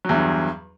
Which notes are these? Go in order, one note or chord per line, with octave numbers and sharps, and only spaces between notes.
E2 G2 F#3